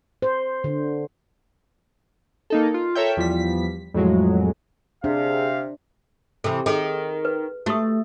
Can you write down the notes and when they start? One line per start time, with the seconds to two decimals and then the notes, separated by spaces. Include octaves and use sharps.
0.22 C5
0.64 D3
2.50 A#3 D#4 A4
2.74 F4
2.95 A4 A#4 C#5 E5 G5
3.17 E2 F3 G3 B6
3.94 F2 A2 F#3 G#3
5.04 C3 D4 G#4 F5
6.44 C3 E3 A4
6.66 D#3 G#4 A4
7.25 B4
7.66 A3 F#4 G4 D#6